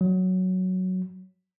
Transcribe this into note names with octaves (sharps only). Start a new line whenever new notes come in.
F#3